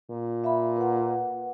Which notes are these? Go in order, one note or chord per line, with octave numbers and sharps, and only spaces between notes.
A#2
E5 F5 B5
B4 F#5